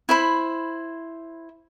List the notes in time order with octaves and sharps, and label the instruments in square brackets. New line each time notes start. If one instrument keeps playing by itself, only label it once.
[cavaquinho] E4 C5 B5